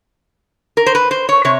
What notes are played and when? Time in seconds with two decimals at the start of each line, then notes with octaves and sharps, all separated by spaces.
0.77 A#4
0.86 C5
0.95 B4
1.11 C5
1.29 C#5
1.45 C3 C#5